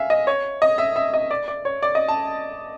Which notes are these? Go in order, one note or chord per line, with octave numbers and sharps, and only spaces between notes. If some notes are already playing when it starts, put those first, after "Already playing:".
Already playing: E5 F5 G#5
D#5
C#5
D#5
E5
E5
D#5
D5
D5
C#5
D5
D#5
A5